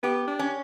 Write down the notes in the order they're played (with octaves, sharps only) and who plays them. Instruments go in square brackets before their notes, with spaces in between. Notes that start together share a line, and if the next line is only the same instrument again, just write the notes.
[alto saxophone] B3 [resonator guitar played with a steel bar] G4
[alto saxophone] D4
[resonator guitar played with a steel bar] C#4